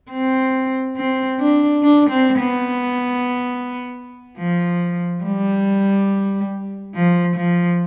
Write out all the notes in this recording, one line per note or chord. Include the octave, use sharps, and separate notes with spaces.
C4
C4
D4
D4
C4
B3
F3
G3
F3
F3